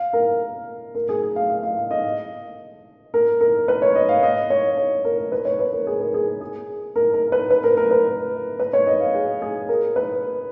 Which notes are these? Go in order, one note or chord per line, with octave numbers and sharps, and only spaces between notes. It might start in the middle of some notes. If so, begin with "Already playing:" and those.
Already playing: F5
A#4
A#4
G#4
G#4
F5
F5
F5
F5
D#5
A#4
A#4
B4
C#5
D#5
F5
D#5
C#5
C#5
A#4
A#4
B4
C#5
B4
A#4
G#4
A#4
G#4
G#4
A#4
A#4
B4
B4
A#4
A#4
B4
B4
C#5
D#5
F5
G#4
G#4
A#4
B4